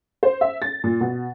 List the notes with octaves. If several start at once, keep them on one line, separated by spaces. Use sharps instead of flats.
C5
E5
A6
A#2
B2